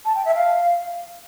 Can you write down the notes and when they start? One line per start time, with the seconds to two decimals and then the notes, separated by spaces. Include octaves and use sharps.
0.05 A5
0.15 G5
0.25 E5
0.35 F5